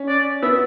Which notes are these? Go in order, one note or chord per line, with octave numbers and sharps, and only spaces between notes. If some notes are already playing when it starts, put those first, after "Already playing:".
Already playing: C#4
D5
B3 E5